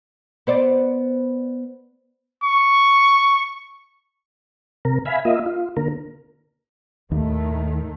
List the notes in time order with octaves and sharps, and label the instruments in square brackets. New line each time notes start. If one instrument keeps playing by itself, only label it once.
[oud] B3 C5 D5
[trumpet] C#6
[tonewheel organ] C3 A#4
E5 F5 G#5 B5
A#3 F4 D#5 E5
F4
D3 A#3 A#4
[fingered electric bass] D#2 [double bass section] A2 D#3 A3